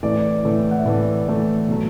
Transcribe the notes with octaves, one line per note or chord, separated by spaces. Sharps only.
A2 E3 A3 D5
A2 E3 A3
F#5
E5
A2 E3 A3 D5
A2 E3 A3
B2 F#3 A3